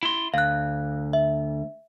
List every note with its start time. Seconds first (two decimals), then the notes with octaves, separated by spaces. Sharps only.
0.03 E4 C6
0.34 D2 F5 F#6
1.13 E5